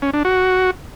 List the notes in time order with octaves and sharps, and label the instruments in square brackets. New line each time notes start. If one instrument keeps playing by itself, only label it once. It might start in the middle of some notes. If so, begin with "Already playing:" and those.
[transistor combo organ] C#4
D4
F#4